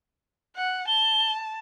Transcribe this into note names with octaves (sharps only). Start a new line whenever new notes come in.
F#5
A5 G7